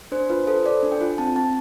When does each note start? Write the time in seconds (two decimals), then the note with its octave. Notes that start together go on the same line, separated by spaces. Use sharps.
0.12 D4 C5
0.30 F4 B4
0.47 A4 C5
0.65 A4 D5
0.83 D4
0.92 G5
1.01 F4
1.18 C4 A5
1.36 C4 A5